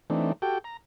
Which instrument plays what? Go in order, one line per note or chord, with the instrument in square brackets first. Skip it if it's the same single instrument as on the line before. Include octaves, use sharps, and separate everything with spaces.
[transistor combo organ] E3 A3 C4 D4 D#4
F#4 G4 A4 G5
A#5